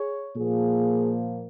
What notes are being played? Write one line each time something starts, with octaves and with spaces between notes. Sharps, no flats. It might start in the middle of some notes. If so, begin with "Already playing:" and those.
Already playing: G#4 C#5
A#2 F3 A#3 G#4